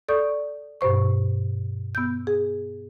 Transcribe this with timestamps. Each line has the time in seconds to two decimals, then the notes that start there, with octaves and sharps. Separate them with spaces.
0.08 A4 D5 C#6 D#6 G6
0.81 G2 B2 C5 C#6
1.95 B3 E6 G6
2.27 G#4